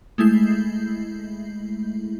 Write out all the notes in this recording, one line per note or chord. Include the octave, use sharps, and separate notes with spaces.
G#3 A3 E4 G6 C7